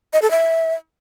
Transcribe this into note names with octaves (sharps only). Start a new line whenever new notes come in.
D#5
A4
E5